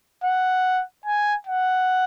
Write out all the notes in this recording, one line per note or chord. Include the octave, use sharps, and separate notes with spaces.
F#5
G#5
F#5